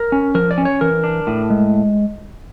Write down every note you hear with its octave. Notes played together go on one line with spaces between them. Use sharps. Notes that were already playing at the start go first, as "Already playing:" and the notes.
Already playing: A#4
C#4
F3 A#4
D5
C#4
C#5
E3 A#4
D4
A2
G#3